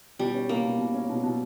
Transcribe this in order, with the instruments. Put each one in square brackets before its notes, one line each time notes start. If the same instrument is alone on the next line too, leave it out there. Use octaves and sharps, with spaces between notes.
[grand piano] B2 [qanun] G3
[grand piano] C#4
[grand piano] B2 [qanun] A#3
[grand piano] B2
B2
C#4
B2
B2